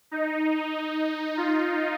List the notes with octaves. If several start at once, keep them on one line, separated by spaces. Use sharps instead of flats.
D#4
F4